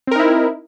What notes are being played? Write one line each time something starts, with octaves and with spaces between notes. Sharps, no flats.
C4 D#4 E4 A#4